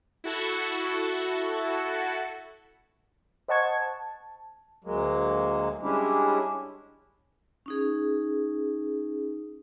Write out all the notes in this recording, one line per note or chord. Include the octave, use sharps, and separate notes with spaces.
E4 F#4 A4
C5 D#5 F#5 A5 C#6 G#6
A5
D2 F#3 G#3 A#3
G3 G#3 C#4 D4 E4 G4
C#4 D#4 G#4